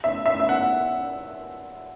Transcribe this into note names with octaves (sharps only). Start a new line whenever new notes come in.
E5
E5
E5
F#5